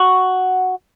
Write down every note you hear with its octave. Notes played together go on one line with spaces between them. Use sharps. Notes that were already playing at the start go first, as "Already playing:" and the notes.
Already playing: F#4